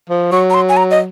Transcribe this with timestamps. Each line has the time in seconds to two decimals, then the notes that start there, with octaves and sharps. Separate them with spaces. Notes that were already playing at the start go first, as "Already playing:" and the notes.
0.10 F3
0.32 F#3 C#6
0.50 A#5
0.54 C6
0.69 G#5
0.77 A#5
0.91 D#5